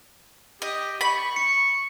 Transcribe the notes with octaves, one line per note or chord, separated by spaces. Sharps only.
G4 D#5
B5 C#6
C#7